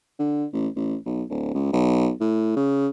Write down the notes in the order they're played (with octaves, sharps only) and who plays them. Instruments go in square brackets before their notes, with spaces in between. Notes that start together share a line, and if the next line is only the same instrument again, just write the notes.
[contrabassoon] D3
A1
A1
B1
D1
C#2
B1
A2
C#3